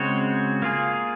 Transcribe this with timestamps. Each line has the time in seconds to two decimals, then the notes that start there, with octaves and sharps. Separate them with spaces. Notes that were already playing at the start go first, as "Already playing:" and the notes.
Already playing: C#3 G#3 C4 F#4 C#5
0.62 A#3 F4 G#4